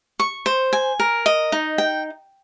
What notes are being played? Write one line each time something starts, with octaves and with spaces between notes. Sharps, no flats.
C#6
C5
G#5
A#4
D#5
D#4
G5